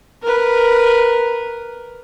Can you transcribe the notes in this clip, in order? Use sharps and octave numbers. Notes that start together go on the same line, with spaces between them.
A#4 B4